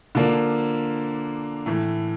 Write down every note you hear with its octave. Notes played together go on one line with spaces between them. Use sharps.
D3 F3 A#3 D4
A2 E3 A3